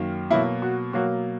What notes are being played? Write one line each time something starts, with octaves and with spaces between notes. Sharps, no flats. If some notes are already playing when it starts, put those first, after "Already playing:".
Already playing: F#2 D#3 A#3
B2 F#3 A#3 E4
F#4
B2 F#3 A#3 F#4